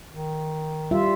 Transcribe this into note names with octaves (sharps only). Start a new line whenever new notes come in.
D#3
G3 F4 E5